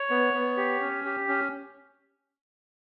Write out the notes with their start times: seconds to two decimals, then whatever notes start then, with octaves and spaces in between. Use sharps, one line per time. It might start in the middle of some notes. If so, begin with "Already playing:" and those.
Already playing: C#5
0.10 B3
0.34 B3
0.57 G4
0.81 C#4
1.05 G4
1.29 C#4